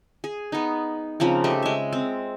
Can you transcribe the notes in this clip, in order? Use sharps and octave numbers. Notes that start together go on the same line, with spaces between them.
G#4
B3 D#4
C#3 F3 A#3 C4
A3 G4 D#5
G#3 E5
C4